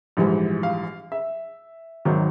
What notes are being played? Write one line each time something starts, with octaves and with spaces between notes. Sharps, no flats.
A#1 G#2 E3 G3
F5
E5
G#1 D#3 F#3